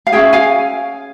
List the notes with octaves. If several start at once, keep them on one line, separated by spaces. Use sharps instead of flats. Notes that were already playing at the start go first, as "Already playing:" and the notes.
F5
C#4 F4 G#4 E5 G5
F5 G#5